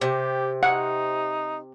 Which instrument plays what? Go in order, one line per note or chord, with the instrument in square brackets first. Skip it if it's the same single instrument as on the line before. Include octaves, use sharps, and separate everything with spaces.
[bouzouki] C3 [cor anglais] G4
[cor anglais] D#4 [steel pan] F#5